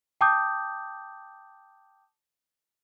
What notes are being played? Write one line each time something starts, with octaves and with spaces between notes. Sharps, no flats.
G5 A5 D6 D#6 G6